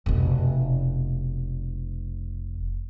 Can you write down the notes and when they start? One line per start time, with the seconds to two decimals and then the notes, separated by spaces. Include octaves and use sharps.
0.06 F1 B2